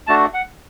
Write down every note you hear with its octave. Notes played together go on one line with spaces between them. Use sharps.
A3 D4 F#4 A5
F#5